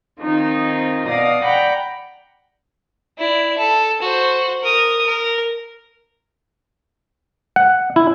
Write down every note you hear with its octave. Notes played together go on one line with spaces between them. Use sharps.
D#3 C4 D#4 F4
B2 D5 F5 D#6 A#6
D5 F#5 G5 A#5 B5
E4 D5
A4
F#4 C5
A#4 D#6
A#4
F#5
E4